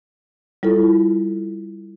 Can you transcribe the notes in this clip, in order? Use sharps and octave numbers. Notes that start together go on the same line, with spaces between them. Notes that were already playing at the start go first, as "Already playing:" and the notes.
G3 E4 F4 A4